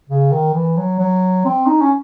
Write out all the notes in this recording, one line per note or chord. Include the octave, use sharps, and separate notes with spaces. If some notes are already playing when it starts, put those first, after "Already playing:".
C#3
D#3
E3
F#3
F#3
C4
D#4
C#4